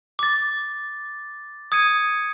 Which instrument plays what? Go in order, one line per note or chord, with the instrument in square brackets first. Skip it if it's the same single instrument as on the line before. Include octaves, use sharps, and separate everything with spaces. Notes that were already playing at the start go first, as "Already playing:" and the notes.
[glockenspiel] D6 A6
D#6 G#6 C#7 D#7